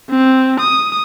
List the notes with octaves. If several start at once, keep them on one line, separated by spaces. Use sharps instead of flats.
C4
D#6